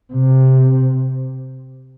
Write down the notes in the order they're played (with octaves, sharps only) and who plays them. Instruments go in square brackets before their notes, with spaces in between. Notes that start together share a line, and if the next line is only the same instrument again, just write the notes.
[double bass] C3